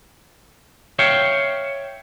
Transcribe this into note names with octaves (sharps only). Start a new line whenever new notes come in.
C#5 E5 F5 G5